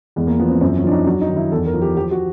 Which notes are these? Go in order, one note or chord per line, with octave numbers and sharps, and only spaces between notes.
E2 G#3
A#3
F3 B3
C4
F#2 C4
C#4
F3 D4
D#4
F#3 D4
D#4
D#3
E4
E2 A4
A#4
F3
G4
F3 G4
F#4